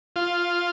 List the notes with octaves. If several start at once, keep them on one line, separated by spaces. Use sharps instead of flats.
F4